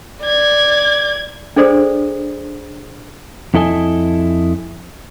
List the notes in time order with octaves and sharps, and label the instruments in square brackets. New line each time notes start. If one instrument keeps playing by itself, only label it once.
[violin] D5 G#6
[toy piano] D4 G#4 A4 C5 D5 D#6
[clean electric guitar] F2 E4 A4 D#5 G#5